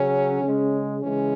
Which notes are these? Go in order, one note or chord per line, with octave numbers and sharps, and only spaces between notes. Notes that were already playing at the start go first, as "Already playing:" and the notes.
Already playing: C#3 F#3 C#4
C#3 G#3
C#3 E3 G#3 C#4